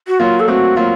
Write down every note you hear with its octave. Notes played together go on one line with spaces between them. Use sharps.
F#4
F#3 A#3 F4
A4
A3 C4 F#4
F#3 A#3 F4